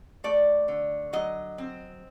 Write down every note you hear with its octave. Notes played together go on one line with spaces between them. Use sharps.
A3 D5
D3
F#3 D#5
C4